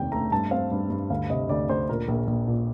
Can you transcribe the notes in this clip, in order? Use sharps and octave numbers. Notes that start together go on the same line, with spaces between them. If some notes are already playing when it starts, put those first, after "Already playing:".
Already playing: F1 D#2 D#3 G5
A3 A#5
G2 A5
C4 F5
G2
G2
D2 F5
C3 D#5
D2 D5
D2 C5
A#2 A#4
A#1 A#4
A#1
A#2